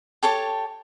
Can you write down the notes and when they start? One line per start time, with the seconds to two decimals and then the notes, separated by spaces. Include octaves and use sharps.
0.23 G4 A4 C#5 A5